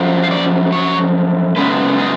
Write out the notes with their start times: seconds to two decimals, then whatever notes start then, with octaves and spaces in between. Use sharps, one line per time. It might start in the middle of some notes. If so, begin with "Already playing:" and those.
Already playing: F#2 F3
0.23 F5
0.31 D5
0.72 C#5
1.56 F#2 C#3 G#3 B3 B4
1.99 G#4